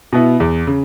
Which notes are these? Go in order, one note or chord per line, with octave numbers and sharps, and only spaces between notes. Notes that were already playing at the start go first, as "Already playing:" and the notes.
B2 B3 E4
E2
C#3